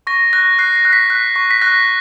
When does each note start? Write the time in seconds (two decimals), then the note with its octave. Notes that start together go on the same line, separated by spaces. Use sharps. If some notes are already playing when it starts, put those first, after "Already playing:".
0.07 C#6 A#6
0.33 F#6 A#6
0.59 F#6 C7
0.76 C7
0.85 F#6
0.93 B6
1.10 F#6
1.36 C#6
1.51 B6
1.61 F#6 A#6